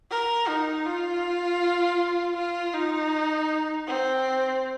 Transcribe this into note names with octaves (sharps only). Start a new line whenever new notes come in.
A#4
D#4
F4
F4
D#4
C4